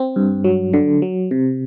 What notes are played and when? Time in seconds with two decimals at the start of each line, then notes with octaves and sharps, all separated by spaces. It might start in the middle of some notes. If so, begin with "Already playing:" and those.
Already playing: C4
0.16 G2
0.44 F#3
0.73 D3
1.02 F#3
1.31 C3